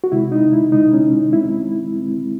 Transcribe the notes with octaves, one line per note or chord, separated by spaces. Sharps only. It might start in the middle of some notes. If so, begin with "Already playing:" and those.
F#4
C3 D#3 G#3 E4
D#4
E4
C3 D#3 G#3 D#4
C#4
D#3 G#3 C4 E4
D#3 G#3 C4